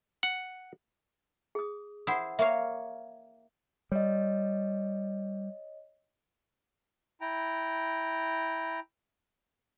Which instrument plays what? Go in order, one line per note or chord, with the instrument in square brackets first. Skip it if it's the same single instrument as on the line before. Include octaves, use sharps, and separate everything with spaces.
[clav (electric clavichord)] F#5
[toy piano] G#4 D#6
[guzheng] E4 C5 [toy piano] F#5 D#6
[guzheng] A#3 C#5 F5 [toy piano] E5
[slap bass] G3 [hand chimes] C#5 D#5
[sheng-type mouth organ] E4 G5 A#5